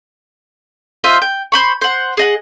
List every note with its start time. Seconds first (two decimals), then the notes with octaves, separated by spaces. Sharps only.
1.04 F4 C5 D#5 E5
1.22 G5
1.52 C5 B5 C#6
1.81 C5 F#5
2.17 G#4 D#5 F#5